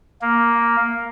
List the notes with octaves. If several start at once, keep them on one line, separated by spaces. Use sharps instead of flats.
A#3